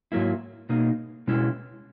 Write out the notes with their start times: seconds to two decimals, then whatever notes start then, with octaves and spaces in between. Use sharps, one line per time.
0.12 G#2 F#3 A#3 E4
0.69 B2 A#3 D#4
1.27 B2 G#3 C#4 E4